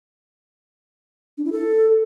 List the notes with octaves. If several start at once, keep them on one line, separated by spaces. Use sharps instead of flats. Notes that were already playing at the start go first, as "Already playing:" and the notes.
D4
E4
A4